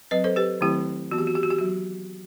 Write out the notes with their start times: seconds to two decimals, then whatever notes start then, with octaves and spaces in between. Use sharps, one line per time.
0.11 F#3 C4 B4 D#5
0.24 A4 C5
0.36 G4 B4
0.61 D#3 F#3 A3 C4 E4 G4
1.11 E3 B3 F#4
1.18 G4
1.27 F#4
1.35 G4
1.43 F#4
1.51 G4
1.58 F#3 F#4